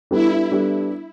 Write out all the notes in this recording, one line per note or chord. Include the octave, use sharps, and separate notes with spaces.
G3 B3 D4 E4 A4
G3 B3 D4 A4